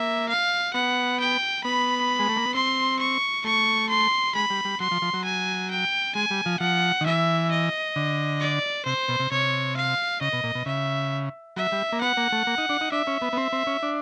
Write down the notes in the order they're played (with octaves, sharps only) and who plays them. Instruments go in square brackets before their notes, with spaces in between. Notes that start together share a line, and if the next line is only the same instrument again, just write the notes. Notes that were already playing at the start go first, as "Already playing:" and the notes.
Already playing: [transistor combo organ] A#3 [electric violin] E5
[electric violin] F5
[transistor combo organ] B3 [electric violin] F#5
[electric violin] G5
[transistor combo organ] B3 [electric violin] B5
[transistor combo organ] G#3
A3
A#3
B3
[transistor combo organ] C4 [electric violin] C6
[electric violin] C#6
[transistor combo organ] A3 [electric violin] C#6
[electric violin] C6
[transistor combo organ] G#3 [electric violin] B5
[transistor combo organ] G3
G3
[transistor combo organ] F#3 [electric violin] C6
[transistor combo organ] F3
F3
F#3
[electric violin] G#5
G5
[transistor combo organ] G#3 [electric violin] G#5
[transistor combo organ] G3
F3
[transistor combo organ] F3 [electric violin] F#5
[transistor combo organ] D#3
[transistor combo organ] E3 [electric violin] E5
[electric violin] D#5
[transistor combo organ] D3
[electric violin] D5
[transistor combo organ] C3 [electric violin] C5
[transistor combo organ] B2
C3
[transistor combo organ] C3 [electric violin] C#5
[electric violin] F5
[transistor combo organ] C#3 [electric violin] D#5
[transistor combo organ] B2
A#2
B2
[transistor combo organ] C#3 [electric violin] E5
[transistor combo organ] F#3 [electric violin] E5
[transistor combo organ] G3
A#3
[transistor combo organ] B3 [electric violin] F#5
[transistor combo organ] A#3
A3
A#3
D#4
D4
D#4
[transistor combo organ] D4 [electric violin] E5
[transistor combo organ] C#4
B3
B3
C4
C4
C#4
D4